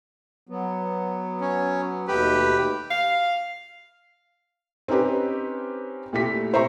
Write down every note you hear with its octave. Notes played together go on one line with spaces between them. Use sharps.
F#3 B3
C#4
D#2 B2 A3 G4 B4
F5
C4 C#4 D#4 G4 B4
A#2 A3 E4 G4 B6
E4 C5 E5 A#5 C#6